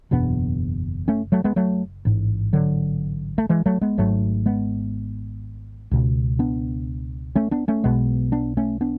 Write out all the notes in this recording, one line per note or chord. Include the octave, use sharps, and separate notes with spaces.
F#1 E2 B2 B3 D4
A3 C#4
F#3 A3
G#3 B3
F#3 A3
A1 G#2
D3 F#3
A3
E3 G#3
F#3 A3
G#3 B3
G#1 G#2 F#3 A3
G#3 B3
C#2 B2
B3 D4
A3 C#4
B3 D4
A3 C#4
B1 B2 G#3 B3
B3 D4
A3 C#4
B3 D4